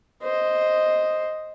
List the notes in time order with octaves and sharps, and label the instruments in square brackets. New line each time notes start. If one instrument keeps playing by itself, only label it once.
[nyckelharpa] C5 D#5